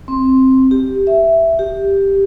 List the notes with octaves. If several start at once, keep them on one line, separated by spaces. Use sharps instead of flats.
C4
G4
E5
G4